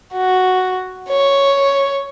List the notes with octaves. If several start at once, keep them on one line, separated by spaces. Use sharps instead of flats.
F#4
C#5